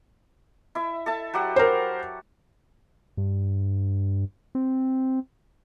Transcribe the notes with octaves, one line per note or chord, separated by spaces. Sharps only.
E4 E5
A4 E5 A5
F#3 G4 F#5
A#4 C5
G2
C4